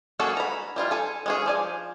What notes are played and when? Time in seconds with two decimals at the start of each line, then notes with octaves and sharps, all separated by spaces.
0.19 A#3 C#4 F#4 G#4 A4
0.37 A#5 B5
0.76 G3 E4 F4
0.91 A4 G#5
1.26 G#3 C#4 G#4
1.46 F3 D5 G#5